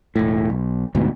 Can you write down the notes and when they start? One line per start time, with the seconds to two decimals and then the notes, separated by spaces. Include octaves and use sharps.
0.16 E1 A2
0.50 B1
0.95 D2 G#2 B2